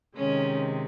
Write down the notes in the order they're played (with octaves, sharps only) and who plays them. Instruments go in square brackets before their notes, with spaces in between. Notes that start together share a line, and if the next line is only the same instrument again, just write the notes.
[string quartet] C3 D#3 G#3 C#4